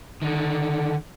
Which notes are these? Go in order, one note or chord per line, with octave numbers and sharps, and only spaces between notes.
D3 D#3